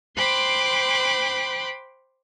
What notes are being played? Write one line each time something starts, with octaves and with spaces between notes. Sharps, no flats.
C5 G5 B5 C6 D6 F#6